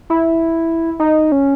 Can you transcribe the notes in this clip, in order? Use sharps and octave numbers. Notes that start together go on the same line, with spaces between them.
E4
D#4
C#4